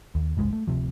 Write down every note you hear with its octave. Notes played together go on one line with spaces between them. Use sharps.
D#2
F#1 C2 G#2 G#3
A3
D1 C#2 C3 F3